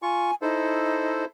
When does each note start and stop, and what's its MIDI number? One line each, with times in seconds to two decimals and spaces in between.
0.02 0.31 65
0.02 0.35 80
0.02 0.31 85
0.42 1.24 63
0.42 1.25 64
0.42 1.25 69
0.42 1.25 72